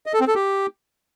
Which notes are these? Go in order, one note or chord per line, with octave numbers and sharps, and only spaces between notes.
D#5
A4
C4
A4
G4